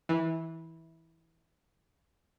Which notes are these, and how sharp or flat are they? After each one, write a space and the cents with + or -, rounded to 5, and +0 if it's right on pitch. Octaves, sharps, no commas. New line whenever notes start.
E3 -15